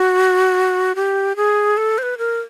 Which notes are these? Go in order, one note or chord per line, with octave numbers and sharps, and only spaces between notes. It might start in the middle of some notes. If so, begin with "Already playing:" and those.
Already playing: F#4
G4
G#4
A4
C5
B4
A#4